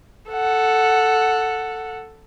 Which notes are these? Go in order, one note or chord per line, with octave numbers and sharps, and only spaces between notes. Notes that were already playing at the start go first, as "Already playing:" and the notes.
A4 F#5